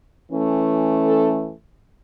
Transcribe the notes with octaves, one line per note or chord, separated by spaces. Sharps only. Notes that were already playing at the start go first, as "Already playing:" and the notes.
E3 A3 C#4
A4